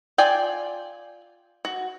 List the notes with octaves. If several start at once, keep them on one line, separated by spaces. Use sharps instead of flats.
F4 D5 G5 G#5
F#4